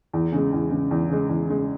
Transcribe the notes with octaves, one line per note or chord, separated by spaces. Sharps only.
E2
C#3 G#3
E2
C#3 G#3
E2
C#3 G#3
E2
C#3 G#3